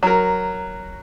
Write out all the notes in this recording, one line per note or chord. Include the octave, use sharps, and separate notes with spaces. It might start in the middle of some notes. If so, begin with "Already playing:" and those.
F#3 A#4